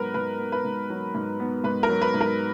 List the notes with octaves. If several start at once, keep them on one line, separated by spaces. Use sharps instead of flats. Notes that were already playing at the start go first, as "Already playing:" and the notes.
Already playing: G#2 F#3 B3 A#4 B4
G#2 B4
B3
B4
G#2
F#3
G#2
B3
G#2 B4
A#4
F#3
B4
G#2
A#4